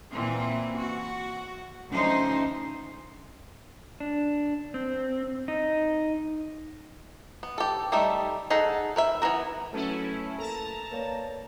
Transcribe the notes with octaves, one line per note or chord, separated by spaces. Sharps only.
A#2 E3 C4
F#4
D2 E3 F3 C#4 D#4 C5
D4
C4
D#4
B3
G4 A4
G3 A3 D#4 E5
D#4 G#4 A4 F#5
A#4 B4 E5
E3 B3 F#4 A#4
F#3 A3 C#4 E4 A4 B4 A5
A#3 A4 A#4 A5 A#5
A#3 B4 C#5 D5